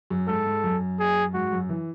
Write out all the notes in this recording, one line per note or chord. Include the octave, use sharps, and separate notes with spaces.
F#2
G#2 A4
G#2
F#2
G#4
G#2 F#4
F#2
E3